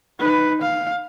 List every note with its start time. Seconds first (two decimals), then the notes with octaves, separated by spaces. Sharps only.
0.19 D#4 B4
0.62 F5